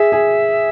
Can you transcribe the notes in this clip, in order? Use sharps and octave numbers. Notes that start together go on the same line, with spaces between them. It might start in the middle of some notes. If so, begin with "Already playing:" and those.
Already playing: G#4 E5
G#4